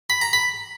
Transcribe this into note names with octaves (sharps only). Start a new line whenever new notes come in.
B5
A#5
B5